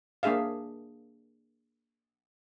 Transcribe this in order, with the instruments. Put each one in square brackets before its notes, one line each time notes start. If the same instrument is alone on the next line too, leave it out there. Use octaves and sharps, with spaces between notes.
[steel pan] A#3 D4 G#4 E5 F5